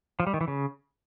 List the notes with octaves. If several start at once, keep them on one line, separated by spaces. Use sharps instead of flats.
F3
G3
D#3
E3
C#3